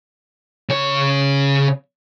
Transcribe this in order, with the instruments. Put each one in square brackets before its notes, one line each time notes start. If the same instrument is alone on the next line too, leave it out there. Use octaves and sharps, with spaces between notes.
[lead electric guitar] C#3 C#5